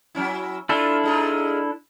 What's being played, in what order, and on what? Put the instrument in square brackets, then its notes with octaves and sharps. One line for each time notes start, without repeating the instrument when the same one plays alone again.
[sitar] F#3 C#4 E4
[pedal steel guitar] D4 E4 A4 [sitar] F4
[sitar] G#3 D#4 F4